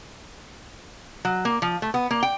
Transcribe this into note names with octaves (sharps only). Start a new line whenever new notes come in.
F#3
A#3
F3
A3
B3
A#3
G5